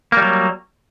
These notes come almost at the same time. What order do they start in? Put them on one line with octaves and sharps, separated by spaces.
A#3 G3 F#3